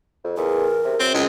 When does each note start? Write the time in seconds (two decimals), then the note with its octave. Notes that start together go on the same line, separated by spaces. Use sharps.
0.24 F2
0.37 E2 A#4
0.85 C3
1.00 F#2 C4
1.14 C#2 G#3